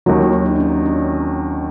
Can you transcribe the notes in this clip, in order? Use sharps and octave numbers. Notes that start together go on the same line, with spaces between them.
D#2 D#3 F#3 C#4
E4
D#4
D4
D4
C#4
C4
C#4
D4